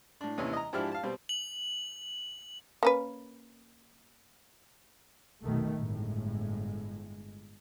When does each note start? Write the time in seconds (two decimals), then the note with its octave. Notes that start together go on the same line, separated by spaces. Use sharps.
0.21 A2 D4
0.38 D#2 C3 E3 C#4
0.53 D#5 A#5
0.73 G#2 F3 D4 E4 G4 F6
0.92 F5 A5
1.03 B2 G3 C4
1.29 F#7
2.83 A#3 C#4 B4
5.43 F1 B1 B2 D#3 A3
5.74 G1 A2 G#3